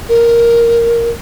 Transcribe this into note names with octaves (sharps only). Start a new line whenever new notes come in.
A#4